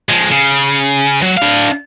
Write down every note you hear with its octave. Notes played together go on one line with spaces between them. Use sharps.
F3 G#3
C#3
F#3
D4 F5